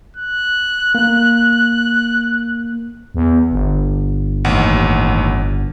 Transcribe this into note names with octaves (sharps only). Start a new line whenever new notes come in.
F#6
A#3
E2
G1
A1 D#2 F#5